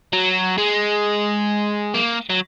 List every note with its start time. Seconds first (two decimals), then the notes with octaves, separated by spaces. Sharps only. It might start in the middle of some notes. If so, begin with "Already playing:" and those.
0.13 F#3
0.58 G#3
1.94 A#3
2.30 F#3